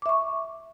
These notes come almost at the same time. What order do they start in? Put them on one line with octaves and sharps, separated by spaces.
D6 E5 C#6